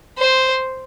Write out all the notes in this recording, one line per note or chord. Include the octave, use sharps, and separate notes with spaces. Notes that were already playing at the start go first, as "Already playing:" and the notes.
C5